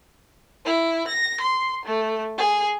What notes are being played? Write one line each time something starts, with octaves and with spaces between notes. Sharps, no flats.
E4
A#6
C6
A3
G#4